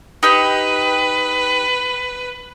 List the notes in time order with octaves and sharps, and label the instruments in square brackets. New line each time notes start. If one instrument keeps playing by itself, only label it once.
[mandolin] D#4 G4 [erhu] B4